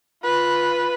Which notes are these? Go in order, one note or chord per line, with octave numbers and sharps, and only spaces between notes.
F4 B4